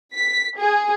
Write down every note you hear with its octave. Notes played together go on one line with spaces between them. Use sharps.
B6
G#4